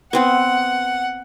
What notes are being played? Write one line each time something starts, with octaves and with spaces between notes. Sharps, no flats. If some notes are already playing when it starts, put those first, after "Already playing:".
B3 C4 B4 F#5